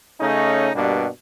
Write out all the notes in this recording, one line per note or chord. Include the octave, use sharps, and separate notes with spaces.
C#3 A3 C#4 D#4
G2 B2 G3 A#3 D4